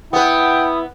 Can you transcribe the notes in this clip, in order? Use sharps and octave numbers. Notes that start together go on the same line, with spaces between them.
B3 E4 B4 G5 D#6